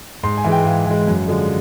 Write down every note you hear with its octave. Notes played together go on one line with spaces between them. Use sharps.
G#2 C6
G#5
E3 G#3
G5
G#2 F5
E3 G#3
F#2
D3 F3 G#3